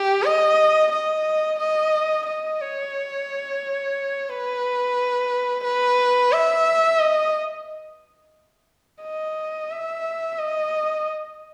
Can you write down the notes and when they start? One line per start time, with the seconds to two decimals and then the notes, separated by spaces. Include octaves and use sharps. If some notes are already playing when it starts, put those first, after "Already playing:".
Already playing: G4
0.24 D#5
0.92 D#5
1.60 D#5
2.27 D#5
2.61 C#5
4.30 B4
5.64 B4
6.33 E5
7.00 D#5
9.03 D#5
9.71 E5
10.39 D#5